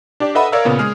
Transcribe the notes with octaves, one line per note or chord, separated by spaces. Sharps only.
D4 G4 D5
A4 B4 D#5 E5 F#5 B5
A#4 C#5 D5 F5 A#5 E6
A#2 C#3 B3
G#3 G#4 F6